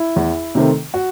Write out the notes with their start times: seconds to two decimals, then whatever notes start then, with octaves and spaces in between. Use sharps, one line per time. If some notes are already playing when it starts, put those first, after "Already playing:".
Already playing: E4
0.16 E2
0.55 C3 D#3 A3 C4
0.94 F#4